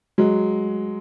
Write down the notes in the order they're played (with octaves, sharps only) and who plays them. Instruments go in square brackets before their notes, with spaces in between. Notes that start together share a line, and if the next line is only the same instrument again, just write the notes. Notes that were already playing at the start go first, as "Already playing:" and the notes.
[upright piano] F#3 G#3